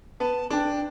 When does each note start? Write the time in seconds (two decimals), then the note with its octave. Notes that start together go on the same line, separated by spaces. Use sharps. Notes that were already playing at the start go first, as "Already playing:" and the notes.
0.20 B3 A5
0.50 D4 G5 A5